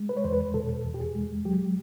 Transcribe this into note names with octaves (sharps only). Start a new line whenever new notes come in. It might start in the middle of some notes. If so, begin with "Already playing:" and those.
Already playing: G#3
B4
C#5
E2 C5
B4
B2 A4
E2
G4
G#4
G#3
F#3 G4